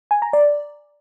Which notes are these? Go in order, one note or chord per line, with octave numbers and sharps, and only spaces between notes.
G#5
A#5
D5